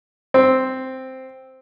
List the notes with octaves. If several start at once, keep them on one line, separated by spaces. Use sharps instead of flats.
C4